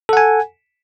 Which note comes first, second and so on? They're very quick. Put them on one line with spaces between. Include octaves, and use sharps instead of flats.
A4 F#5 G#5